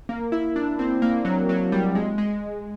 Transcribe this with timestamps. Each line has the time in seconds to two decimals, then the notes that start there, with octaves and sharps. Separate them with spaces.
0.09 A#3
0.32 E4
0.56 D4
0.79 C4
1.02 A#3
1.25 F#3
1.49 F#3
1.72 G3
1.95 G#3
2.18 G#3